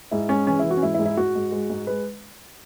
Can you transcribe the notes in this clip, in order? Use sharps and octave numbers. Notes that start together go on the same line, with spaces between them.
G#2 E4
G#3 C#4
E3 C#4
E3 E4
F#4
C#4
G#2 E4
E4
G#2
E4
G#2 F#4
G#2
G#3
G#2
G#3 B4